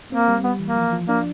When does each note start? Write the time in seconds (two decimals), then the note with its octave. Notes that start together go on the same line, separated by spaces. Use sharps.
0.12 A#3 C4
0.28 G3
0.44 G3 B3
0.60 E3
0.66 A#3
0.76 F3
0.93 F3
1.08 A#3 D4